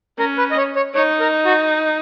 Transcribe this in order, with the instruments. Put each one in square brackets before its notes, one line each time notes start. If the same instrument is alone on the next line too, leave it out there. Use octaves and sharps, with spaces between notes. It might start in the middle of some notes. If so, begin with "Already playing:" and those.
[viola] C#4 [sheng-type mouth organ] A#4
[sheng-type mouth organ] B4
D#5
C#5
C#5
[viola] D#4 [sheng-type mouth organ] C#5
[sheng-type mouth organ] A#4
F#4